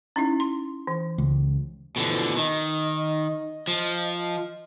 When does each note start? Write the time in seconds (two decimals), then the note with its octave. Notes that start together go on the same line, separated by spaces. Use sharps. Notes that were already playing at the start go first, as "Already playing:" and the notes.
0.16 C#4 D#4 E4
0.40 C6
0.87 E3
1.18 C#2
1.96 B2 D3 E3 F3
2.36 D#3 D#5
3.67 F3